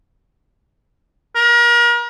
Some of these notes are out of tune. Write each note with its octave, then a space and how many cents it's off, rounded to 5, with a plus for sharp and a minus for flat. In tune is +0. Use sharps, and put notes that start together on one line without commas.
A#4 +35